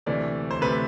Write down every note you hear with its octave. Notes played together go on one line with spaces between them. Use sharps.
D2 C3 E3 A3 D5
C5
D2 C3 E3 A3 B4